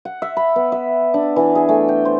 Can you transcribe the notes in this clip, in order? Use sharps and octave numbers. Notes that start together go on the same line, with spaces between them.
F#5
E5
B5
B3
E5
D4
E3
G#4
A3
G5
C5